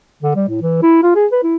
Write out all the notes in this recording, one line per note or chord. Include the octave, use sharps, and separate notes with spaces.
D3
G3
A2
E3
E4
F4
G#4
B4
E4